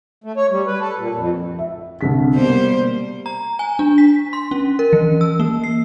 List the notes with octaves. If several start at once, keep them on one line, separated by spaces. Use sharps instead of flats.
A3
C#5
G3
B4
A4
A#2
F2
E5
C2 D3 B6
B2 G3 A#3 C5
A#5
G#5
D4
B6
C6
C#4
A#4
E3
E6
A#3
C7